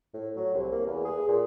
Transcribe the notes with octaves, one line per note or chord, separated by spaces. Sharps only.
A2
F#3
C2
A#3
E2
G#4
A#2